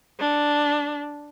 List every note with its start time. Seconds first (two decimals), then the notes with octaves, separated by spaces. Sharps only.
0.20 D4